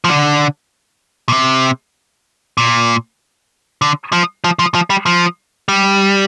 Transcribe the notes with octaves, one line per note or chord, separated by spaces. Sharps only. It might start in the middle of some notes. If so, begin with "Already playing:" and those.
F3
D3
A#2
C3
A#2
D3
F3
F3
F3
F3
G3
F3
G3